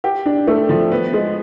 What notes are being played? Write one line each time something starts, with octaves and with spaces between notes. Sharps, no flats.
G4
D4
A3
F3
B3
G#3